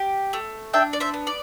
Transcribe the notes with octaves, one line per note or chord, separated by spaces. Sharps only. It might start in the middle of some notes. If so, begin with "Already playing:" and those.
Already playing: G4
A3
D4 E5 G5
D5
C5 E5
B3
D5